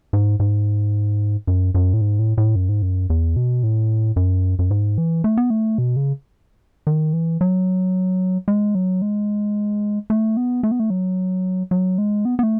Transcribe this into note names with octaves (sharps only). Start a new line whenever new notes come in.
G#2
G#2
F#2
F#2
A2
G#2
A2
A2
F#2
G#2
F#2
E2
B2
A2
F#2
F#2
G#2
E3
A3
B3
A3
B2
C#3
D#3
E3
F#3
G#3
F#3
G#3
A3
B3
A3
B3
A3
F#3
F#3
G#3
B3
B3
A3